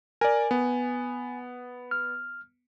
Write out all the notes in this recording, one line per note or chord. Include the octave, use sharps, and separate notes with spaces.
A#4 D5 G#5
B3
F6